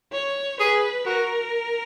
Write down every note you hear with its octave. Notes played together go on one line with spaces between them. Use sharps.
C#5
G#4 B4
F#4 A#4